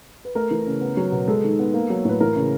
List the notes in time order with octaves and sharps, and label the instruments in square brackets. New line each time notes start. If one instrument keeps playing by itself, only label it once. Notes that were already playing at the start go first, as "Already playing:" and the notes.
[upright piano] B4
A3 A#4
E3
C#3
B3
F#3
B2
G#3 A4
D#3
B3
A#3
F#3
A2 B4
E3 A#4
C#3